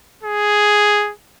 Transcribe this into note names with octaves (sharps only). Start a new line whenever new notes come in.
G#4